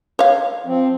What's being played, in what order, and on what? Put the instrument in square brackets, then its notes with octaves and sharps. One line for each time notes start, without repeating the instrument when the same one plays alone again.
[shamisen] C#5 F5
[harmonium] F3 C4